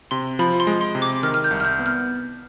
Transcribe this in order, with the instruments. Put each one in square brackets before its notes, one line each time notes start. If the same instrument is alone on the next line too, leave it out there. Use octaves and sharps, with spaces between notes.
[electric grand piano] C3 [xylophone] C6
[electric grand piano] F3 [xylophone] B5
[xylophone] C6
[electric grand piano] G#3
[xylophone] C6
[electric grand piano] C3
[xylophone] D6
[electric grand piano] D#3 [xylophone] F6
[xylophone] F6
G6
[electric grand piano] C2
[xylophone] F6
G6
[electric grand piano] B3
[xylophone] F6